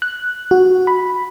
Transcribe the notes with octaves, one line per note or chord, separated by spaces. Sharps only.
F#6
F#4
B5